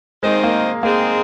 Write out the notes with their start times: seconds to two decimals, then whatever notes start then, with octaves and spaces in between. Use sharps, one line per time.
0.23 D#2 D#3 G#3 C4 D#4 C5
0.44 A#3
0.83 D#3 G#3 A#3 C4 G#4 C5